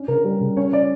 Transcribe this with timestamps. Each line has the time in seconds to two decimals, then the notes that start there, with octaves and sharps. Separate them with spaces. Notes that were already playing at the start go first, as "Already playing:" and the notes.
Already playing: C#4 D4
0.08 C#3 A#4
0.24 G3 A#4
0.41 C#3
0.57 C#4 C#5
0.73 D5